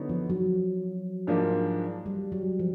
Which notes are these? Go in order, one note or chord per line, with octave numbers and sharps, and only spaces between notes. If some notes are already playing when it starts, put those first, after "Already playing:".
Already playing: D3 F#3 B3 D#4
F3
F#3
G#2 F3 A#3 D4
G3
F#3
F3